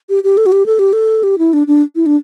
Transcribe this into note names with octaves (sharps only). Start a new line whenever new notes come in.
G4
G4
A4
F#4
G4
A4
G4
A4
G4
E4
D4
D4
E4
D4